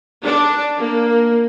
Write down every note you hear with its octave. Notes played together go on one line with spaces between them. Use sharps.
D4
A#3